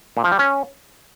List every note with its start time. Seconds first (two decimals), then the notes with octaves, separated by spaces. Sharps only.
0.17 A#2
0.24 F3
0.32 G3
0.39 C#4